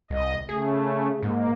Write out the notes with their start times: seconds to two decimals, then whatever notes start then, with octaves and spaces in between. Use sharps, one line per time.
0.10 C2 D#5
0.49 C#3 A3 G#4
1.22 G#2 A#3